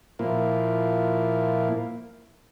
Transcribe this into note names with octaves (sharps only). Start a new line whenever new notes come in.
A#2 F3 A#3 E4